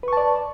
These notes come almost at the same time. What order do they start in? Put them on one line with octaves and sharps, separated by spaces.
B4 C#6 A5 D5